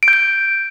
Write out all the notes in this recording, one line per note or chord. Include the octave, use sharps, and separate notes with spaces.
D7
G6
D7